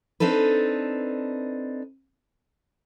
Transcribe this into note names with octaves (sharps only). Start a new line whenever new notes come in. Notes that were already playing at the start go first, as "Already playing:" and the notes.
C4 D4 D#4 A4 B4